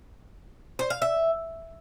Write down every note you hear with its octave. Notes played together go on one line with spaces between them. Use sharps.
C5
F5
E5